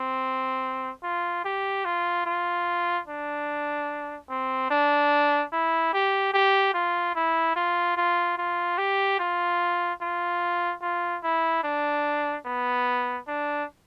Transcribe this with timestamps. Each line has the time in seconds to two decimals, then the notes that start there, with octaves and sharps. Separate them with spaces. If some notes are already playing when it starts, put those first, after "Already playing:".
Already playing: C4
1.03 F4
1.45 G4
1.85 F4
2.26 F4
3.07 D4
4.30 C4
4.71 D4
5.52 E4
5.94 G4
6.34 G4
6.74 F4
7.15 E4
7.56 F4
7.97 F4
8.38 F4
8.78 G4
9.20 F4
10.02 F4
10.82 F4
11.23 E4
11.64 D4
12.46 B3
13.28 D4